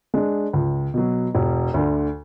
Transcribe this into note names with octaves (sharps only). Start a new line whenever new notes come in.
G#3 D4
C#2
B2 F#3
E1
D2 D3